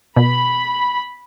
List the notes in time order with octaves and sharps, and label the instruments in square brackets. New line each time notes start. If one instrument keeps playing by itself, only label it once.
[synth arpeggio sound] B2 [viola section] B5